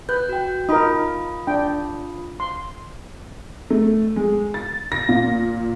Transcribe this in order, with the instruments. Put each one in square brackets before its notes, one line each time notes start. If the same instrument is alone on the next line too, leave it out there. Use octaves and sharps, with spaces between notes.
[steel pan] B4 [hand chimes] F#6 G6
[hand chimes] F#4 G5
[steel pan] D#4 A#4 [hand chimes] F4 B5 D#6
[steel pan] D4 G5
C6
[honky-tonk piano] A3
G#3
A6
A#6
A#2